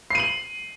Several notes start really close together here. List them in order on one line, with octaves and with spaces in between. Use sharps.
C7 D#7 F#7